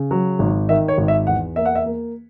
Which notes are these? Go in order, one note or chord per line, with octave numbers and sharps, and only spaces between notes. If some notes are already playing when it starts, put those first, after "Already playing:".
Already playing: C#3
F#3
G#1
D#3 E5
C#5
G#1
E5
E2 F#5
A#3 E5
F#5
E5
A#3